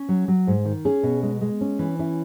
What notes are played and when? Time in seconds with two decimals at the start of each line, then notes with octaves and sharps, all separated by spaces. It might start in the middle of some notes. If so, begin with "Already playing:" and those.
Already playing: C#4
0.09 F#3
0.28 F#3
0.47 G#2
0.65 D#3
0.85 C#4 G#4
1.03 B2
1.23 G#3
1.41 G#3
1.61 C#4
1.79 E3
1.99 C#4 E4